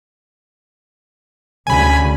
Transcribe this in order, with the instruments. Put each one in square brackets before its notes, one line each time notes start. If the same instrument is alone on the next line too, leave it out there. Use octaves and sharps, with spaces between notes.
[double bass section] D2 C#3 [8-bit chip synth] G#5 B5